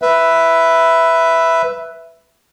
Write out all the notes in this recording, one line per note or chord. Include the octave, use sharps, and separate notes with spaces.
B4 E5